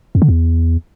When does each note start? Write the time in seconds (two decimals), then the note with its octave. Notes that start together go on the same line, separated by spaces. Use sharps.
0.15 F2
0.22 D3
0.29 E2